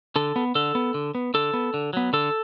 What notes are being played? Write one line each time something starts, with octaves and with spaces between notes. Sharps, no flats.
D3 A4
B3
D3 A4
B3
D3
B3
D3 A4
B3
D3
F#3 B3
D3 A4